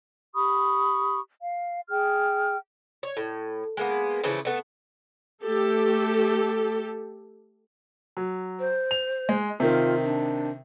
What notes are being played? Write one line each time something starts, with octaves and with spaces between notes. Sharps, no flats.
G4 B5 C#6 D#6
F5
G#4 G5 F6
C#5
A2
G#3 A#3 B3
C#3 E3 F3 A3
A3 B3 A4
A3 G4 A4
F#3
C5
F7
G#3
C3 D#3 F4
D4